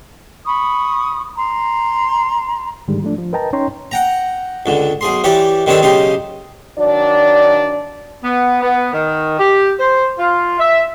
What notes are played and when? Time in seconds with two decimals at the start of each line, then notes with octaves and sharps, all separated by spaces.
0.45 B5 C#6 D#6
1.37 A#5 C6
2.88 G#2 D3 D#3 G3 G#3
3.02 F3 A3 D4
3.18 F3
3.33 A#4 B4 D#5 G5 A5 A#5
3.53 C#4 D#4 C#5 G5 A#5 C6
3.91 F#5 G5 A#5
4.66 C#2 D3
5.01 B1 G#4 C6
5.24 E3 G4 C#5 D5
5.66 D#3 G3 C4 D4 A4 C#5
5.82 B1 C#3 D#4 G4 C6
6.79 D#3 F#3 D4 D5
8.24 B3
8.63 B3
8.92 D#3
9.39 G4
9.80 C5
10.19 F4
10.59 E5